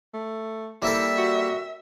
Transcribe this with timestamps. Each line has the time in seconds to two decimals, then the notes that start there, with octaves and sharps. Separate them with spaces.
0.14 A3
0.82 G3 A#3 C4 E4 A4 E5
1.17 F#4